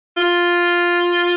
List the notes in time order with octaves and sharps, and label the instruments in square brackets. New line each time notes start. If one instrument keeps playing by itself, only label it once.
[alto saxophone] F4